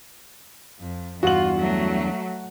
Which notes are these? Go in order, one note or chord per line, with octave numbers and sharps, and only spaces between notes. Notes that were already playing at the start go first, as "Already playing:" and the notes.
F2
E2 G2 F4 F#4 F#7
F#3 A3